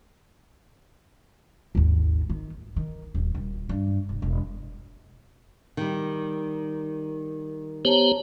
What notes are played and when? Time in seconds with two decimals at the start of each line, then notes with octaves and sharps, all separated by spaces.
1.75 G#1 D#2
2.30 D#3
2.76 D#3
3.14 D#1
3.35 D#1
3.69 G2
4.09 E1
4.22 E1
5.77 D#3 G3
7.85 B3 G4 C5 C#5 A5 A#5